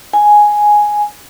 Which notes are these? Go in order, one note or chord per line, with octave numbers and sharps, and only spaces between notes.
G#5